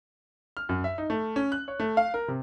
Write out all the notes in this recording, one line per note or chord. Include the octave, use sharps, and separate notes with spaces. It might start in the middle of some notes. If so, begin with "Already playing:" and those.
F6
F#2
E5
D#4
A3
C#4
F#6
C#5
A3
F5
A#4
C3